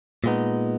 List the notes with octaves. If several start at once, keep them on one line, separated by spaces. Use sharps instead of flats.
A#2 G#3 B3 D#4